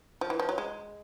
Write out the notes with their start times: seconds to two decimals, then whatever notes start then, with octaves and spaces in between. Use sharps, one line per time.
0.21 F3
0.30 E3
0.40 F3
0.49 F#3
0.58 G#3